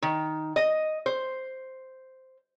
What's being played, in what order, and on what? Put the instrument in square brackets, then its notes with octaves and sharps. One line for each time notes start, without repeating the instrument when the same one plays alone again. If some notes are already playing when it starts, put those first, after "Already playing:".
[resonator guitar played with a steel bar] D#3
D#5
C5